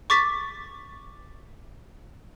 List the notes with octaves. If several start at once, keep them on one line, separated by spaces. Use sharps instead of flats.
C#6 D6 A6 B6